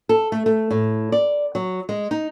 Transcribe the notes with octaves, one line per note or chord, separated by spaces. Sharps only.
A4
A3
A3
A2
D5
F#3
G#3
D#4